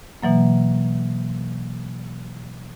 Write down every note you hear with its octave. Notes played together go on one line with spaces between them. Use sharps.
B2 E3 F#3 A#3